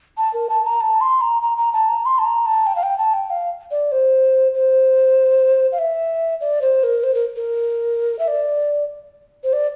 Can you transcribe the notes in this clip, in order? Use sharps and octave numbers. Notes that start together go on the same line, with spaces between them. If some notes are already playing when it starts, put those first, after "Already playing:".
A5
A#4
A5
A#5
A5
C6
A#5
A#5
A#5
A5
A#5
C6
A5
A#5
A5
G5
F5
G5
A5
G5
F5
D5
C5
C5
F5
E5
D5
C5
A#4
C5
A#4
A#4
E5
D5
C5
D5